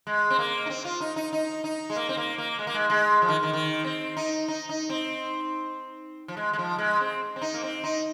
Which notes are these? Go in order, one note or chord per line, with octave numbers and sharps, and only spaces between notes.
G#3
C4
A#3
D#4
C4
F4
D#4
D#4
D#4
D#4
G#3
A#3
C4
A#3
A#3
G#3
A#3
G#3
G#3
F3
D#3
D#3
D#3
C4
D#4
D#4
D#4
C4
F3
G#3
G#3
F3
G#3
C4
C4
D#4
A#3
C4
D#4